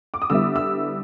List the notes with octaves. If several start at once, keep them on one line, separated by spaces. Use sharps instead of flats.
D6
D#6
D3 G3 B3 E4 E6
E6